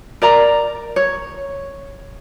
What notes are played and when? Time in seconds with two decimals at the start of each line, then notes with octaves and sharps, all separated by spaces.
0.22 A#4 D5 A#5
0.96 C#5